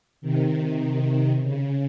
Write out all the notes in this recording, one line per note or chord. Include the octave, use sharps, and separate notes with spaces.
C3 D#3
C#3